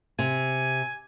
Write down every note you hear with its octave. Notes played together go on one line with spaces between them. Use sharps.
C3 G#5